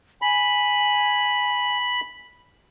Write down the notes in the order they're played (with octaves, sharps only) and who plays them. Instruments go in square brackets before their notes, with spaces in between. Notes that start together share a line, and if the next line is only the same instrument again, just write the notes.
[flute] G#5 [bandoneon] B5